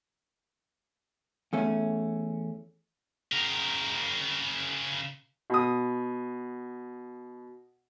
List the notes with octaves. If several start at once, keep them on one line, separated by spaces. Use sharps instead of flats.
E2 A3 C#4
C#3 A#4
B2 D#6